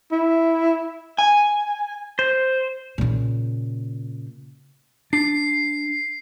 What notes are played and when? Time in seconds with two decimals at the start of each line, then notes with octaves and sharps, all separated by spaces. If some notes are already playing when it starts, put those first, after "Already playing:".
0.12 E4
1.18 G#5
2.19 C5
2.98 A#2 C#3
5.13 D4 C7